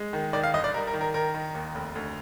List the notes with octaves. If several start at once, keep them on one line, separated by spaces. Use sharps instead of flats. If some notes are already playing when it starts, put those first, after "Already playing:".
Already playing: G#3
D#3
D#3 D5
F5
G1 D#5
D5
G3 A#4
A#4
D#3
A#4
D#3 A#4
D#3
D#2
F1
D2